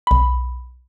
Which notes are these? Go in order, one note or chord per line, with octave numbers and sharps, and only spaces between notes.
B1 B5